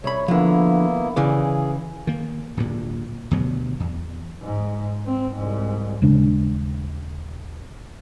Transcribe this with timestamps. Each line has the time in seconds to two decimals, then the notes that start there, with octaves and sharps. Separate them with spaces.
0.04 C2 C#5 B5
0.28 D3 F3 A#3 B3 E4
1.16 C#3 E3 G#4 D5
2.07 D#3 A#3
2.57 D1 D2 G2 A#2
3.31 D2 G2 B2 F#3
3.80 E2
4.42 G#2
5.06 C4
5.35 C2 G#2
6.02 D#1 C#3 G#3 D4